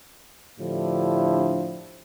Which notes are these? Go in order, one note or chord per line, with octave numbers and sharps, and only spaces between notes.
A2 D3 F3 D4 E4 G4